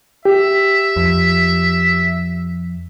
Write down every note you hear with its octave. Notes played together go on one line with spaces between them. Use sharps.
G4 E5
F2